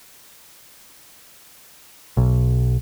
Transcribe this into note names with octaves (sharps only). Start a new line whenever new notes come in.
B1